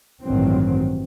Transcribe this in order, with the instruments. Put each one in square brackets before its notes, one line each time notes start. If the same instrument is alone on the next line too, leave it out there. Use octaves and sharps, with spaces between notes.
[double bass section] A1 G2 D#3 E3 F#3 C4